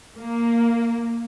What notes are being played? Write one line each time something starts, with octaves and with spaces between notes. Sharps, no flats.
A#3